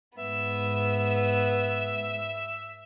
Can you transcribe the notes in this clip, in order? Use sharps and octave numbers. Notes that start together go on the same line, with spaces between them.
G#2 B3 E5